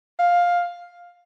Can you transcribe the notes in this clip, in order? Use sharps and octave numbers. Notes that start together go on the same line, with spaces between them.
F5